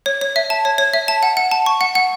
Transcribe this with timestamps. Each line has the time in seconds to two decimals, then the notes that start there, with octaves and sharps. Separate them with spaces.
0.06 C#5
0.21 C#5
0.36 E5
0.50 A5
0.65 C#5
0.78 C#5
0.94 E5
1.08 A5
1.23 F#5
1.37 F#5
1.51 A5
1.66 C#6
1.81 F#5
1.95 F#5